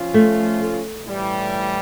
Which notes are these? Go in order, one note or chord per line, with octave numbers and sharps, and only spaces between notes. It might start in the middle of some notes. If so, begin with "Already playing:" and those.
Already playing: F3 C#4 F4
A3
A2 E3 G3